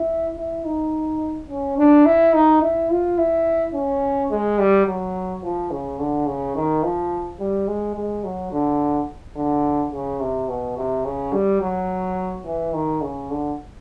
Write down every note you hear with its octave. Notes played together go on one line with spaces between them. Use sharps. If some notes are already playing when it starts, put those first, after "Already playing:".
Already playing: E4
E4
D#4
C#4
D4
E4
D#4
E4
F4
E4
C#4
G#3
G3
F#3
F3
C#3
D3
C#3
D#3
F3
G3
G#3
G#3
F#3
D3
D3
C#3
C3
B2
C3
C#3
G3
F#3
E3
D#3
C#3
D3